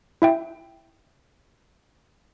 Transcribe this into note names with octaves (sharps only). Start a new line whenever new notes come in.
E4 E5 G5